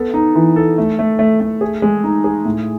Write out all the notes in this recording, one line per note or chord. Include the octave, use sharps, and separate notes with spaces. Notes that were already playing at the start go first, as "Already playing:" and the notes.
Already playing: B3 A4
D#4
E3
A4
A3
A3
A3
A3
G#4
G#3
D#4
G#4
A2